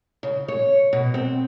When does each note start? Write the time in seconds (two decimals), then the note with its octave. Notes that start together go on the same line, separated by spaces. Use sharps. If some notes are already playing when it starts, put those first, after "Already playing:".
0.23 C#3
0.48 C#5
0.93 B2
1.14 C4